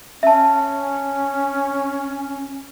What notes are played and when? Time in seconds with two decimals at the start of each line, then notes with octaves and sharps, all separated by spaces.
0.23 C#4 E5 A5